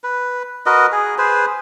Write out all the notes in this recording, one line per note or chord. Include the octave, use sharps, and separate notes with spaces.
B4
F#4 A#4 B4 D#5
G#4
G#4 B4 C5